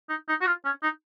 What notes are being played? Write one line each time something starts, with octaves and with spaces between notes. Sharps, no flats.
D#4
D#4
F#4
F4
C#4
D#4